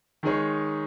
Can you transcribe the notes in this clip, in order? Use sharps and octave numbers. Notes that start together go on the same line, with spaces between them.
D#3 G#3 D#4 G#4 C#5